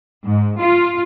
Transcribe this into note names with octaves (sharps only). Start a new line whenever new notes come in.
G#2
F4